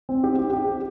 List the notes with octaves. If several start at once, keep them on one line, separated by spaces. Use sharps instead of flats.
C4
G4
G4
G4